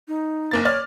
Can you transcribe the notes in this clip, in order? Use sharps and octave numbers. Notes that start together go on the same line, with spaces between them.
D#4
F#1 A#3 A6
C#5 D5 F6 A6